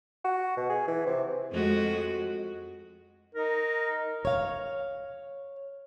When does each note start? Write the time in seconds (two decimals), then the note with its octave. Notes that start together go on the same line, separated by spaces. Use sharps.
0.25 F#4
0.57 B2
0.70 G#4
0.87 E3
1.07 C3
1.52 F2 G#3 F#4
3.35 D#4 A#4
4.25 C#5 F5